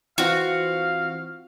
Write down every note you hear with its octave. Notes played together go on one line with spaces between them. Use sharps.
E3 C4 F4 F#4 F5